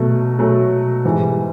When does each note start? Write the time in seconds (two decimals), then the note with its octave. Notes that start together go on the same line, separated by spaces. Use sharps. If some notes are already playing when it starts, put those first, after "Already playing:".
Already playing: B2 F#3 A3
0.38 B2 F#3 A3
1.05 G#2 E3 G3